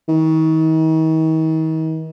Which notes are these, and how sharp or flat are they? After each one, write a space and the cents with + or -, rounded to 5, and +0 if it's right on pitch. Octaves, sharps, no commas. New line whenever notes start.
D#3 +40